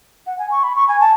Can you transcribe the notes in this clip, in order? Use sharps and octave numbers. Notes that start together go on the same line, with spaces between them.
F#5
G#5
C#6
B5
C#6
G#5
A5